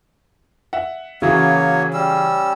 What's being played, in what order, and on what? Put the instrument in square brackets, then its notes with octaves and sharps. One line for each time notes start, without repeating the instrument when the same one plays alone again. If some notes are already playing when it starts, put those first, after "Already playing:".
[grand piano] E5 F#5
[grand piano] C#3 E3 F#4 [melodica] F#3 A#3 C#5
[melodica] G3 C#4 E6